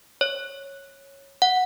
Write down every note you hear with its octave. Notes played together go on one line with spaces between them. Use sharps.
C#5
F#5